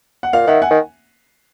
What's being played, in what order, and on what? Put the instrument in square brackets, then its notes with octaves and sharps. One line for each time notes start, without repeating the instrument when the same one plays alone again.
[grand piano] F#5
[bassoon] A#2 [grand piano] F5
[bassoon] D#3 [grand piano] E5 F#5
[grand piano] F#5 G#5
[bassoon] D#3